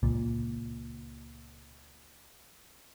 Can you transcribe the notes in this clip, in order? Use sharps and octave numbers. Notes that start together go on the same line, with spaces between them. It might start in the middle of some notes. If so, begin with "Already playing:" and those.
C#2 A#2